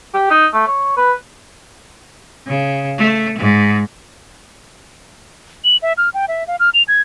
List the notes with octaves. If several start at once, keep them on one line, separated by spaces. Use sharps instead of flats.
G4
D#4
A3
C#5
B4
C#3
A3
G#2
F#7
E5
F6
G5
E5
F5
F6
F7
G#6